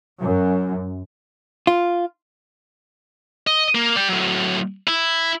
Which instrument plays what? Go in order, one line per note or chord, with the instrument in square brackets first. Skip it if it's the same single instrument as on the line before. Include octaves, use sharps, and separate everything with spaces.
[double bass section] F#2
[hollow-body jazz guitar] F4
[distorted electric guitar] D#5
A#3
D5 G5
A2 F#3
E4